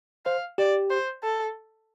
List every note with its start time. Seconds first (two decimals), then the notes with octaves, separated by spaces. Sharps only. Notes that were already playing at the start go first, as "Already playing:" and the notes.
0.26 C5 F5
0.58 G4 D5
0.90 C5
1.23 A4